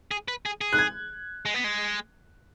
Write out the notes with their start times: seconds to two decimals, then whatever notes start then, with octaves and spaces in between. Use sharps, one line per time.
0.11 G#4
0.28 B4
0.46 G#4
0.61 G#4
0.73 F#6
0.78 G#6
1.46 G#3
1.54 B3
1.64 G#3